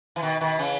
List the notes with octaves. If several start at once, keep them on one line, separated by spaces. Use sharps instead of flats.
E3
B2 D#3
B2 D#3
C#3 E3